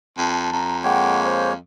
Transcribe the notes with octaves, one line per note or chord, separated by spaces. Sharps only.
F2 A5
F2 A#5
G#3 A#3 C#5 F#5 G5
C5 F5